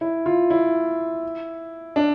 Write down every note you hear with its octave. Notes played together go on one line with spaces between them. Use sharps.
E4
F4
E4
D4